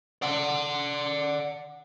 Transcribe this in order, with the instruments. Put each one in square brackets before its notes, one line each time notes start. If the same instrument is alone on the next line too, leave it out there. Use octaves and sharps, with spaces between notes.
[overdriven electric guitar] D5 F#5